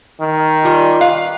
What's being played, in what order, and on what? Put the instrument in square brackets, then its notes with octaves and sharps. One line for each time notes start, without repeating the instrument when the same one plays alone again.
[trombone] D#3
[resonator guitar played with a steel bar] G3 G#5 [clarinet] F4
[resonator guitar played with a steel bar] B4 F5